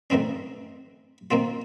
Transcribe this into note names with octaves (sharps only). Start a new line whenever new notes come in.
A2 D#3 E3 C4 C#4
D#3 A#3 C4 F4